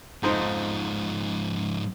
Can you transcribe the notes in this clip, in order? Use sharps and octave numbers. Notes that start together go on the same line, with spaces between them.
F2 G#2 F3 D#4 C5